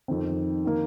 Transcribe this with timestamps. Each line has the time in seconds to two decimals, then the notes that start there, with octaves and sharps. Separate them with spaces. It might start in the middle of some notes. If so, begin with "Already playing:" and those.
0.08 F2 D#3 C4
0.65 D#3 A#3